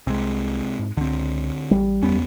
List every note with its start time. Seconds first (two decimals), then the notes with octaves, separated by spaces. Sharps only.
0.07 C2 C3 G#3
0.79 G#2
0.97 C#2 D3 C4
1.71 A1 G3
2.03 F#1 E2 B3 C#4